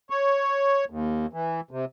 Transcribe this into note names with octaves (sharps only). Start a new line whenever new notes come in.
C#5
D#2
E3
C3